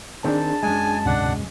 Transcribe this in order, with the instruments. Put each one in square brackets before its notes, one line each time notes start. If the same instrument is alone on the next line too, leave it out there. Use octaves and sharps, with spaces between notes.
[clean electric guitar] D#3 C4 [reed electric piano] D4 G#4 [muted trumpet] A5
[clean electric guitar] F#2 G#3 [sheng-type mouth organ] G#5
[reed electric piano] D2 G#2 C3 [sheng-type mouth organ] D4 F#5